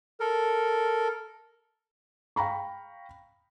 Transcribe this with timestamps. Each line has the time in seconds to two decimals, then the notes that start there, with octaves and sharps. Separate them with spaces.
0.20 A4 A#4
2.36 F5 G5 A#5 B5 C#6